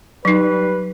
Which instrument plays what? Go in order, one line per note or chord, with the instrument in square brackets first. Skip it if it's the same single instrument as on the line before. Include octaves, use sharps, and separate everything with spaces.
[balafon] F#3 D#4 [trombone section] G3 B4